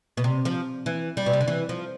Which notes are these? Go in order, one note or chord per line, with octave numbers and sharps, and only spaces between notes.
B2
C3
F3
E3
G3
B2
C3
D3
E3
F3